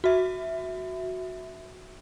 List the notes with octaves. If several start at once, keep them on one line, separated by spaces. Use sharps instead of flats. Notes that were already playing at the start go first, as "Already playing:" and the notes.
F#4 E5